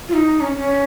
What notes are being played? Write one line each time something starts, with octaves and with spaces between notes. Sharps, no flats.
F4
D#4
C#4
C#4